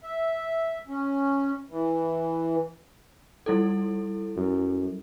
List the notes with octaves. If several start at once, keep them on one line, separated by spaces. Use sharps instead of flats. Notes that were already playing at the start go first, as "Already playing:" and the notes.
E5
C#4
E3
G3 E4 A4
F#2